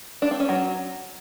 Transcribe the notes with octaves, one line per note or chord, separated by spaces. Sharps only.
D4
C4
C#4
F#3